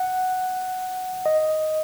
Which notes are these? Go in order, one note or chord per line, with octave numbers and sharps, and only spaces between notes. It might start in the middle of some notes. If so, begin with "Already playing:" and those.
Already playing: F#5
D#5